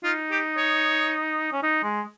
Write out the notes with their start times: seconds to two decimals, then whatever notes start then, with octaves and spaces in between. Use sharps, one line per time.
0.04 D#4 F4
0.31 G4
0.57 C#5
1.52 C#4
1.63 D#4
1.83 G#3